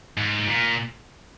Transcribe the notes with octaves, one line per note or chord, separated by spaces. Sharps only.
G#2
A#2